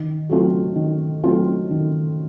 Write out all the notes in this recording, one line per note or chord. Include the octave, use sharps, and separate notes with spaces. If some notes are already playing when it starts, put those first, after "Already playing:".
Already playing: D#3
F#3 A3 C4 F4
D#3
F#3 A3 C4 F4
D#3